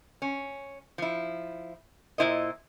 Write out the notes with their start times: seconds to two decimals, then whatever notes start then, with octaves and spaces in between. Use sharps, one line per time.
0.22 C#4
0.98 F3 E4
2.18 A#2 A#3 E4 C5 D#5